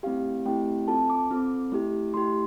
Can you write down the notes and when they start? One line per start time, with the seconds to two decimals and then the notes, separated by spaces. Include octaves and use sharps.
0.03 A3 C4 E4 G4 F5
0.46 A3 C4 E4 G4 G5
0.88 C4 F4 A4 A5
1.10 D6
1.31 C4 F4 A4
1.72 A3 E4 G4
2.14 A3 E4 G4 C6